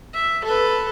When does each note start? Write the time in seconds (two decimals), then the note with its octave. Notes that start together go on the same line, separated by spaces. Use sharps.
0.14 E5
0.45 A4 B4